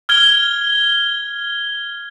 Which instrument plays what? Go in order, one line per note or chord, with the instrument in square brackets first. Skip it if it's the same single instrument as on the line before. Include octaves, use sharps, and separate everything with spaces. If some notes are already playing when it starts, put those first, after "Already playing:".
[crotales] F6 G#6 G7